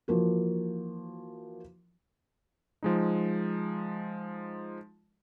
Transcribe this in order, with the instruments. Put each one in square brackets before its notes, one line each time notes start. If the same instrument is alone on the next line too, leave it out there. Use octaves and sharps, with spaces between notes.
[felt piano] E3 F3 A#3 F#4
[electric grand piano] F3 G#3 D#4